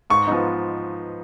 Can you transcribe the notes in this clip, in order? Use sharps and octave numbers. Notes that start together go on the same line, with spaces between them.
G#2 C#6
F3 B3 D#4